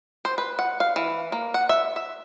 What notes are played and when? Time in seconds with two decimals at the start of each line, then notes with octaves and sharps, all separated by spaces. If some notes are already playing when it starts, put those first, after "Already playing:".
0.25 C5
0.38 B4
0.59 F#5
0.80 F5
0.96 E3
1.32 A#3
1.54 F#5
1.69 E5
1.96 E5